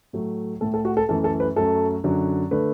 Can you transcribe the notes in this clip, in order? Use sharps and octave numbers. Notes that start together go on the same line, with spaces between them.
A2 F#3 A3
A2 A3 A4
A4
F#4
A4
F#2 E3 A3 A4
A4
B4
F#2 F#3 A3 A4
F#2 D3 F#3
D3 A3 B4